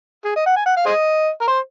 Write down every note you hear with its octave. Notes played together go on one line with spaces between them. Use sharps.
G#4
D#5
F#5
G#5
F#5
F5
G#4 C5 D#5
A#4
C5